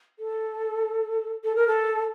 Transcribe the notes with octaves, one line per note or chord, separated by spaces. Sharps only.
A4
A4
A#4
A4